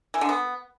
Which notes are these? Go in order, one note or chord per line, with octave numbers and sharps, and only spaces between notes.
E3
D3
B3